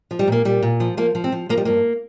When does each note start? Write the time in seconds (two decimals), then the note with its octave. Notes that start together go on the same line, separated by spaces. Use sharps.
0.11 F3
0.19 G3
0.27 A#2 A#3
0.45 A#2 G3
0.63 A#2
0.80 F3
0.97 F3 A#3
1.15 F3
1.24 C4
1.32 F3
1.49 F3 A#3
1.57 G3
1.65 G2 A#3